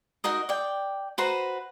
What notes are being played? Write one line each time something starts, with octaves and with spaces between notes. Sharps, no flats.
D#4 F#4 A#4 D#5
D5 G5
F#4 B4 C5 A#5